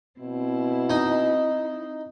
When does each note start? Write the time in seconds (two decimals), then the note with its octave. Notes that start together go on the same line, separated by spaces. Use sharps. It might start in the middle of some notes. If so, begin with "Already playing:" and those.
0.20 B2 C4 E4
0.90 D#4